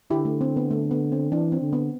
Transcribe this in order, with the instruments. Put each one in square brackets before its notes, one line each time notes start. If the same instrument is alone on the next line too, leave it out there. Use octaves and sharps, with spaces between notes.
[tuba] D3 [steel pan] E4 G4
[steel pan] A3
C4
B3
A3
B3
C4
[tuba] E3 [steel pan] D4
[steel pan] C4
[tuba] D3
[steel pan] B3